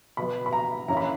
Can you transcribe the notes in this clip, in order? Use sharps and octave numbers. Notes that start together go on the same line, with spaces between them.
B2 F#3 B3 B5
B5
A#5
F#2 E3 A#3 C#4 A#5
B5